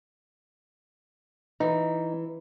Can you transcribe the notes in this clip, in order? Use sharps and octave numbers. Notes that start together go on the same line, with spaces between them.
E3 D#4